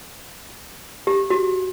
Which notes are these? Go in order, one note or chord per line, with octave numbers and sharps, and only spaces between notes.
G4
F#4